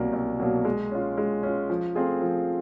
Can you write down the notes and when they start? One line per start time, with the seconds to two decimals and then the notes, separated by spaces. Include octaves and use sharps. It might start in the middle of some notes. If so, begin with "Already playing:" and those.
Already playing: C2 B2 F#3 A#3
0.13 C2
0.40 B2 F#3 A#3
0.65 G#3
0.92 C#4 F4
1.17 G#3
1.43 C#4 F4
1.70 F3
1.95 A3 C4 F4 G#4
2.22 F3